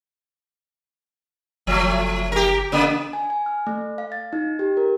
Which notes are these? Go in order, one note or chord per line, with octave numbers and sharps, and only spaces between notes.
F#1 F3 A3
G4 A#4
C#3 A#3 B3
G#5
G#5
F6
A3
F5
A6
D#4
G4
A#4